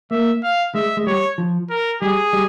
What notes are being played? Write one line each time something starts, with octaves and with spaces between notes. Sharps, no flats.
A#3 E5
F5
G#3 E5
G#3
G3 C#5
F3
A#4
G3 G#4
G3